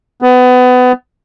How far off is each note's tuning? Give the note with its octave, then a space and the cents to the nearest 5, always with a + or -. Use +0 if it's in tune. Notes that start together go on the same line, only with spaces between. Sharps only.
B3 +25